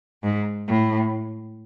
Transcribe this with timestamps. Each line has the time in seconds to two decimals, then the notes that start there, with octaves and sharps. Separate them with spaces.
0.23 G#2
0.67 A2